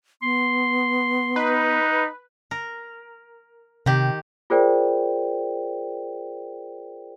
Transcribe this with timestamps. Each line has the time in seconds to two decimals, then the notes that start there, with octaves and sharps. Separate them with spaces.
0.22 B3 C6
1.36 D#4 B4
2.51 A#4
3.86 C3 D#3 G4
4.50 F4 G#4 A#4 C5 D5 G5